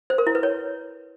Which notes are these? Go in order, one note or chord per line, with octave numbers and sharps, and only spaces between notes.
C5
A#4
E4
B4
C#5